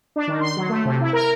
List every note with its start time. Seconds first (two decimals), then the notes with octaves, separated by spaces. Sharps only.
0.16 D4
0.27 D#3
0.41 C6
0.56 F#3
0.69 A3
0.85 C3
1.01 E4
1.13 A#4